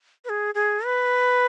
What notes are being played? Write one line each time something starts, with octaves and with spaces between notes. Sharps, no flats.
B4
G#4
G#4
B4